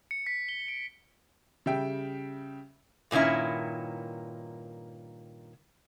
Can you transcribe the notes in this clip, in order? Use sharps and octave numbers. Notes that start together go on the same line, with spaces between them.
C#7
B6
G7
D7
C#3 G3 E5 G5
G2 A#2 D#3 C#4 E4